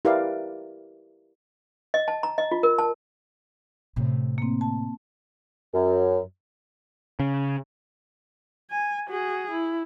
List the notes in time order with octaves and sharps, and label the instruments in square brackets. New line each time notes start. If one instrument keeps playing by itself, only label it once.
[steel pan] E4 G4 A#4 B4 D5 F5
[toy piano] D#5
A5
A#5
D#5
F4
A#4
A5
[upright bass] A2 C3
[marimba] A#3 C4
A5
[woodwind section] F#2
[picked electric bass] C#3
[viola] G#5
F#4 G#4
E4